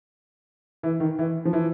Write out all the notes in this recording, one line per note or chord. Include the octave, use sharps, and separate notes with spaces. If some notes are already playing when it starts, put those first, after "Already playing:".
E3
D#3
E3
F3
E3